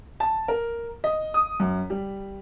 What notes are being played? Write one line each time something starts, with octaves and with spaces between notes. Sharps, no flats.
A5
A#4
D#5
D#6
F#2
G3